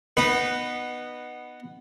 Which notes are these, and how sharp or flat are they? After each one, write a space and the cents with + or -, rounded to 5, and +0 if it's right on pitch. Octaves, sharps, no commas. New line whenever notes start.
B3 +0 D#4 -20 B4 +0